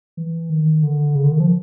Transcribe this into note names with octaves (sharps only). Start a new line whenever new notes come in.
E3
D#3
D3
C#3
D3
D#3
F3